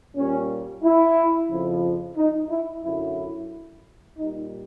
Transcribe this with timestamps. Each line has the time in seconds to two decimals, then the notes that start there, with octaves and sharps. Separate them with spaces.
0.16 A#2 G3 C#4
0.83 E4
1.50 F2 C#3 F3
2.16 D#4
2.49 E4
2.83 F#2 D3 F#3 E4
4.17 A#2 G3 D#4